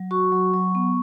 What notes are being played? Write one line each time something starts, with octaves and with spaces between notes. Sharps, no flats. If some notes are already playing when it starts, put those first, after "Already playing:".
Already playing: F#3
F#4 C#6
F#3
F#3
B3